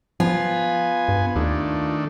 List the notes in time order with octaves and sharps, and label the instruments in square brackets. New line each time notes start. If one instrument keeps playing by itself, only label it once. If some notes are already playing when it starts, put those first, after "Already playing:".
[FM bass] F3 [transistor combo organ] B3 G#5 [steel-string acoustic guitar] F4
[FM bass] G2
[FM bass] D#2 [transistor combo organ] D#3 A3 D4